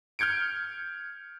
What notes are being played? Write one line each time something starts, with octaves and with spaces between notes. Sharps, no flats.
F6 G6 G#6 C#7 D7